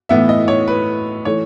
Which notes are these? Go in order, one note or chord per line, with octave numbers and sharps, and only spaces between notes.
A2 E3 B3 E5
D#5
C#5
B4
E3 A3 C#5